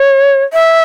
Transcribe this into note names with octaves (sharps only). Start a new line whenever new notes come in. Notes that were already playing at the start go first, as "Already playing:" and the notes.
Already playing: C#5
E5